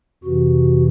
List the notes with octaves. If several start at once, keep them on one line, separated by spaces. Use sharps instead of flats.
F2 C3 E3 F#4